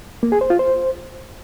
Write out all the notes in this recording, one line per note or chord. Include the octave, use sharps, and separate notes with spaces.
A#3
G#4
C5
F4
C5